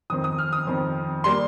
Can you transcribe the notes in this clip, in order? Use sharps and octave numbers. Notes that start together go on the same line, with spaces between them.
F2 D#3 C4 D#6
D#6
F6
D#6
F2 D#3 C4
G3 A#3 C6